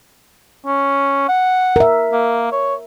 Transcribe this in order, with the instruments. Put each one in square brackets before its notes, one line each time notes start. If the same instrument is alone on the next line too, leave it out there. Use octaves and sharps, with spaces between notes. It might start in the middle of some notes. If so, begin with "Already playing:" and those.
[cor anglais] C#4
F#5
[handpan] A#4 E5
[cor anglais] A#3
C#5